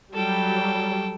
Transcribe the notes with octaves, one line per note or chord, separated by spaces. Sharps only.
F#3 G3 A4 G5